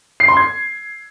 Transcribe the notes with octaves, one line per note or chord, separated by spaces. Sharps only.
C7
C6
G#6